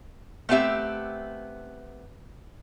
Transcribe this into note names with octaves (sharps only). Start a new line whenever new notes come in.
A3 B3 C4 G4 E5